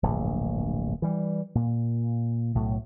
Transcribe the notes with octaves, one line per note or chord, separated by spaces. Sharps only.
D1 A#1 G2
E3 G3
A#2
B1 A2 F#3